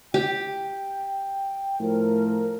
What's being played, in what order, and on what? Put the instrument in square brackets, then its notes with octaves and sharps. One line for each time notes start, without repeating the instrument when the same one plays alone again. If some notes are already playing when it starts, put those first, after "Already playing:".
[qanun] G4 [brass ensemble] G5
[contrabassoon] A2 [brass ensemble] F3 [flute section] A#4